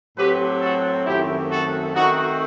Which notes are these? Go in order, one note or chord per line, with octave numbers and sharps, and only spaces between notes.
A2 F#3 C4 G4 B4
F#4 A4
F#2 D#3 A3 C4 E4 G4
F#4 A4
D#3 A3 C4 D#4 F#4